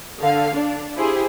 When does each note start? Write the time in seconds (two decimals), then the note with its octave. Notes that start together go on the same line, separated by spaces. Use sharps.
0.19 D3 F5
0.55 D4
0.96 E4 G4 G#4 C5